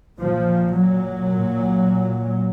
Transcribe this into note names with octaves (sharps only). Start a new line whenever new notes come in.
A#2 F3
F#3
A#2